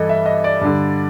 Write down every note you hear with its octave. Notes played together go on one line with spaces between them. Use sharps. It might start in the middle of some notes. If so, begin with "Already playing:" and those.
Already playing: G2 E3 A4 D#5
E5
D#5
D5
G2 D3